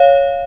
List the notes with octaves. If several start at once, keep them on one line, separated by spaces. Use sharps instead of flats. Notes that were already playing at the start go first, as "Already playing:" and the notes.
Already playing: C#5 F5